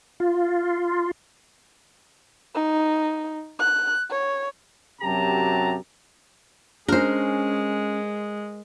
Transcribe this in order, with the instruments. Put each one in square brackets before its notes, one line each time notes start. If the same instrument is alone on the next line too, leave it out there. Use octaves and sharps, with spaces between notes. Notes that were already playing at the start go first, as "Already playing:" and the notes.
[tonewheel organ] F4
[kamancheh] D#4
F#6
C#5
[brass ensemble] F#2 C3 F#3 G4 A5 A#5
[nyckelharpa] G#3 [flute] C#4 [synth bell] D4 [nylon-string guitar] A#4 C5